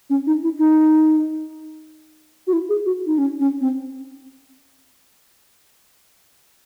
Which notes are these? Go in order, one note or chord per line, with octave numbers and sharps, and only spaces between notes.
C#4
D#4
E4
D#4
F#4
E4
G#4
F#4
D#4
C#4
C#4
C4